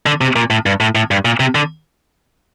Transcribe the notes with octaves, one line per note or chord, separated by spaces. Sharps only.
D3
C3
A#2
A2
G2
A2
A2
G2
A#2
C3
D3